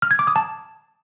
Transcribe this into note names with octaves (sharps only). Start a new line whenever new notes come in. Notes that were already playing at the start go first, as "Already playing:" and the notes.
F6
G#6
D6
D#6
A5